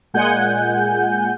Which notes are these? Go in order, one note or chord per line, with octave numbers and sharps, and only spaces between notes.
A#2 G#3 F#5 G#5 G6